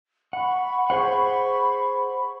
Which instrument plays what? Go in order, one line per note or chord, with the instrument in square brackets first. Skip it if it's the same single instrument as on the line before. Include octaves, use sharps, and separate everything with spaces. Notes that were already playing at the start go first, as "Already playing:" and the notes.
[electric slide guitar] F#5 [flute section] B5 C#6
[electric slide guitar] G#4 C5 F#5